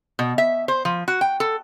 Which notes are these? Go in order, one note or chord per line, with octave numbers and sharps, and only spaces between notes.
B2
E5
C5
F3
F#4
G5
A4